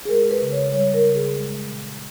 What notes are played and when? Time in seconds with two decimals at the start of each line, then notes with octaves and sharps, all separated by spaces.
0.05 G#4
0.09 G#3 A#4
0.31 B4
0.42 C#3
0.52 C#5
0.73 G3 C#5
0.94 A#4
1.04 C#3
1.15 G#4
1.37 G#3
1.69 A#2